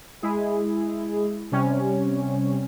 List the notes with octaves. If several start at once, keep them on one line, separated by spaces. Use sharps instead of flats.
G#3 E4 G#4
C3 G3 C#4